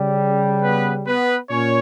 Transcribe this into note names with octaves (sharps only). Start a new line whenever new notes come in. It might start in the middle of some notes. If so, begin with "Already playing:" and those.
Already playing: C#3 G3
B3 B4
B3 B4
A#2 C#4 C#5